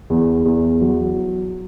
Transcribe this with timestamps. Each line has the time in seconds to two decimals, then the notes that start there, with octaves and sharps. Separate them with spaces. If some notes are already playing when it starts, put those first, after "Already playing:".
0.10 E2
0.45 E2
0.81 F#3